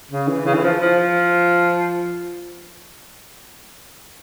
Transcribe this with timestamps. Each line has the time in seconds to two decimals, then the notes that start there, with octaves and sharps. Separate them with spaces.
0.11 C#3
0.28 E3
0.45 C#3
0.54 E3
0.62 F3
0.80 F3